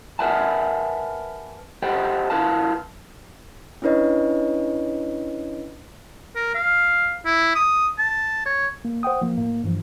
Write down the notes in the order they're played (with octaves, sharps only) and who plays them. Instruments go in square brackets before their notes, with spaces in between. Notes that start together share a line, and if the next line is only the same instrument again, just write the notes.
[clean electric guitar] A#4 B4 E5 F#5 G#5 A5
G4 A4 C5 D#5 F#5 G5
E4 A#4 B4 F5 A5
[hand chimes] C#4 D4 E4 B4 C#5 D#5
[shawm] A#4
F5
E4
D#6
A5
C#5
[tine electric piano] A#3
C5 F#5 G5 D#6
F3 A#3
A2 A#3
G2 E3 F3